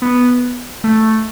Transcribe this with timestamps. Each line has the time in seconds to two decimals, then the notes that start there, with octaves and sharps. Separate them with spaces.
0.02 B3
0.84 A3